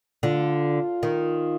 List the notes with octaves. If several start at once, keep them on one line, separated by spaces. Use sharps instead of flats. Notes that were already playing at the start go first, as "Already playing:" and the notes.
D3 F4
D#3